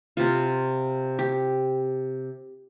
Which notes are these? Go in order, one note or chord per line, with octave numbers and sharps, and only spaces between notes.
C3 C4 F4
G4